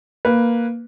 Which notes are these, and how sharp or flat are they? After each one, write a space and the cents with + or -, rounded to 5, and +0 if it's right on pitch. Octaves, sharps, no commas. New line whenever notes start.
A#3 +0 B4 +0